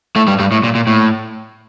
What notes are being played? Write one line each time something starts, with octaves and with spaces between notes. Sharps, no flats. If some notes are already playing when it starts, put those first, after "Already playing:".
A2 A3
G2 G3
G2 G3
A2
A#2
A#2
A2